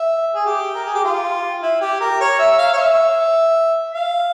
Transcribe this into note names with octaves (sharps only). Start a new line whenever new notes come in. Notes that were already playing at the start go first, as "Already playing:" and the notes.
Already playing: E5
G#4
G4
A#4
G#4
G4
F4
E4
G4
A#4
C#5
E5
F5
C#5
E5
F5